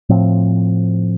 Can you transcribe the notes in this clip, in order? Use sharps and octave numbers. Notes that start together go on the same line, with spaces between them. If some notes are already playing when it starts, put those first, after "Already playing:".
A2 F3 C4